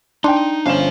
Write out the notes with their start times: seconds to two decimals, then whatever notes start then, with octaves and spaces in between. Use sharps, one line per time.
0.24 D4 D#4 G5 C6
0.66 G1 C#4 C5 F5 E7